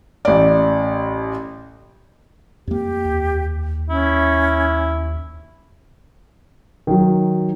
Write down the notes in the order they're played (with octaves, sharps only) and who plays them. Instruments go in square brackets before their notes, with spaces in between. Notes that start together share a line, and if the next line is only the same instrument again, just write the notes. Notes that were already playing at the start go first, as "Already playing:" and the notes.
[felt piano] A1 D5
[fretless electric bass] F2 A#3 [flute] G4
[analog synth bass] D#2
[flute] C#4 [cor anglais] E4
[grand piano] D#3 F#3